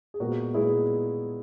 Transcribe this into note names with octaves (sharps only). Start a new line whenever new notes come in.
G#4
A#2 G#3 B3 F#4 A#4
A#2 G#3 B3 E4 G#4